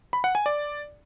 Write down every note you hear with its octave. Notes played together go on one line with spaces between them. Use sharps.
B5
F#5
G#5
D5